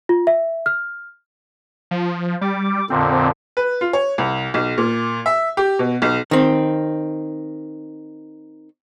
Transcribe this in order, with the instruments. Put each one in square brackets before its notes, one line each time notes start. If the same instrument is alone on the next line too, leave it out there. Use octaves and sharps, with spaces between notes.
[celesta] F4
E5
F6
[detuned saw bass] F3
[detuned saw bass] G3 [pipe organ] D6
[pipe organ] F2 A#2 D3 [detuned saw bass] C4
[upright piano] B4
F4
C#5
C2
B1
A#2
E5
G4
B2
B1
[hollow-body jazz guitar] D#3 C4